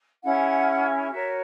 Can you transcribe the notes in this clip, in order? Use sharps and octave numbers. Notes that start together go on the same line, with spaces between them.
C#4 E4 G#4 F#5
F#4 A#4 C#5 E5